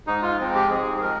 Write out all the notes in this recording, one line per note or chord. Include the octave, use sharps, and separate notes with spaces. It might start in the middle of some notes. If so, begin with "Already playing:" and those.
G#2 D#4
F4
F3 G#3 C4
G4
G#2 G#4
G#4
F3 G#3 A#4